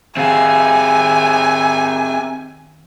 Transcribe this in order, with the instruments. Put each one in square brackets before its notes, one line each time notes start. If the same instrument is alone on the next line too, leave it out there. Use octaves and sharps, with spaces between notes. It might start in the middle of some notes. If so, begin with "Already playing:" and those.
[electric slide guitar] D#3 F5 [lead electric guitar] C4 G#4 [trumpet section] G4 E5 [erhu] G#5